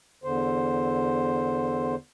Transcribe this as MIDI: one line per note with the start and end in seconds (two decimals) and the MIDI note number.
0.24 1.95 40
0.24 1.95 50
0.24 1.95 72